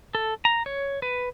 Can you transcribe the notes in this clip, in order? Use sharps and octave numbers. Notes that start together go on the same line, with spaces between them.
A4
A#5
C#5
B4